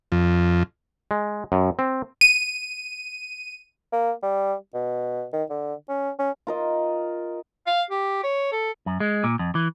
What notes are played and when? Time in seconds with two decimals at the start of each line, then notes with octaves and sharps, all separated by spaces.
0.12 F2
1.11 G#3
1.52 F#2
1.79 C4
2.21 D#7
3.93 A#3
4.23 G3
4.74 B2
5.33 D#3
5.50 D3
5.89 C#4
6.19 C#4
6.47 F4 A#4 D#5
7.67 F5
7.91 G4
8.24 C#5
8.52 A4
8.86 F#2
9.00 G#3
9.24 A#2
9.39 F2
9.55 E3